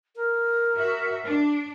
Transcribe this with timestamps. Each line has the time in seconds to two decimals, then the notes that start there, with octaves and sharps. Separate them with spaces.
0.16 A#4
0.77 F#4 E5
1.25 D4